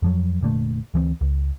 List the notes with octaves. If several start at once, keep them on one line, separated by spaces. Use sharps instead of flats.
F2 F3 F#3
F1 A#2 D3 A3
D2 E3 G#3 C4
C#2